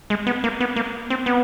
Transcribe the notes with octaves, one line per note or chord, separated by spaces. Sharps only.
G#3
B3
A#3
B3
A#3
C4
B3